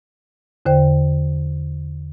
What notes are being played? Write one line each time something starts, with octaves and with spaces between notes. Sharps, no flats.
E2 D3 C5 G5